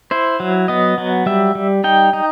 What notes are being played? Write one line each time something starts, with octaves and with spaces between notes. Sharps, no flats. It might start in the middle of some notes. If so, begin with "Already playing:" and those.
E4 C5
F#3
B3 D#5
F#3
G3 E5
G3
D#4 G5
D#4